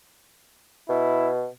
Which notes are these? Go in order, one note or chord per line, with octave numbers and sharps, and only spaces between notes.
B2 E4